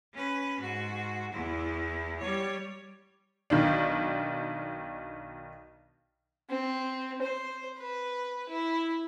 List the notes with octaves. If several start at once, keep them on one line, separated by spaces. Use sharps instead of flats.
C#4 B4
G#2 F#4
E2 E4
G3 C#5
B1 D#3 D4
C4
C5
B4
E4